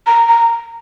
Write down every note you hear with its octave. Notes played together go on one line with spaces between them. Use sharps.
A#5
A#5